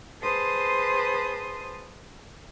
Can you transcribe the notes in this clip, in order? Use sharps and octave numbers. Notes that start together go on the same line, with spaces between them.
G#4 B4 C5 A5 C6 D#6